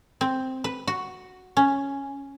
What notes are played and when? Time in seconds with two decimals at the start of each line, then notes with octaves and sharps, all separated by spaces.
0.21 C4
0.64 B4
0.87 F#4
1.57 C#4